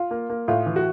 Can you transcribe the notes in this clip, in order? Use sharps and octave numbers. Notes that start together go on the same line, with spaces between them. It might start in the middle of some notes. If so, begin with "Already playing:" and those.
Already playing: F4
A#3
A#3
A2 F4
E3
F#4